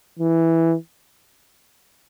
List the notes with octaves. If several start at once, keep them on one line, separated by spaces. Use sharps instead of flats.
E3